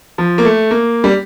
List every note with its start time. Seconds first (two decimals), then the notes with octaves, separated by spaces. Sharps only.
0.18 F3
0.38 A#3
0.45 A3
0.71 A#3
1.04 G3